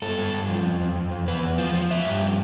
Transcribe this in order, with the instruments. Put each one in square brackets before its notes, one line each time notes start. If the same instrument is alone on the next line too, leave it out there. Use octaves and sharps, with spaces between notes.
[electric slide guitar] G2 A4
G2
G2
F3
F2
F2
F2
F2
E2 B4
E2
F3
F3
F3 E5
G2
F3